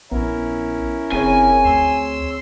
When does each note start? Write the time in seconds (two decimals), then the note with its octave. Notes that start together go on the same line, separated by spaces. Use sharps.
0.12 A#1 B3 C#4 E4 A#4
1.12 F#1 C4 G#4 C#5 G#5
1.65 D2 C6 E6